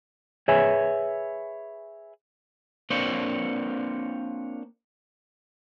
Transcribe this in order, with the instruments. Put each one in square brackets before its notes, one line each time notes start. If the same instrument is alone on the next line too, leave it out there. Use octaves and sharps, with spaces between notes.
[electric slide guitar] G#4 B4 C#5 E5 G#5
[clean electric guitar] A#3 C4 D4 F4 C5 C#5